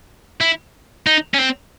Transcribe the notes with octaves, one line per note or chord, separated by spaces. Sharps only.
E4
D#4
C#4
C4